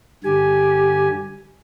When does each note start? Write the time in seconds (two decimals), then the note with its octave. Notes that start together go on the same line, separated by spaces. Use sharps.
0.24 G2 D3 G4 G#5